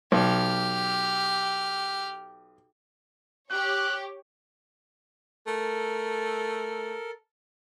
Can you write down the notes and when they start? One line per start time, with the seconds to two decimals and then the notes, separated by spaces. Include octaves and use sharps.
0.12 B1 G4 F6
3.51 G4 C#5 F#6
5.47 A3 A4 A#4